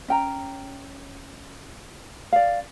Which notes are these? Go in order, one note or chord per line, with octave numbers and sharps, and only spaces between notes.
C#4 G5 A#5
D5 F5